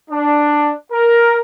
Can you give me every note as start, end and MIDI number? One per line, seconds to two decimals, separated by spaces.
0.11 0.71 62
0.91 1.40 70